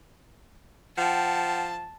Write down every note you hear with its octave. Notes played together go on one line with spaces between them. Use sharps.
F3 F#5 G5 A5